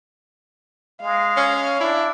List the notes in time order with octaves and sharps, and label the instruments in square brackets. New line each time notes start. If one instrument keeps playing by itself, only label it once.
[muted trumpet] G#3 [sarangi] F5
[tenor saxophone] C#4
[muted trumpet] D4 [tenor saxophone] E4